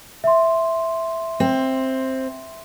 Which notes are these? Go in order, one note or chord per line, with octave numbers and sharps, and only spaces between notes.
E5 C6
C4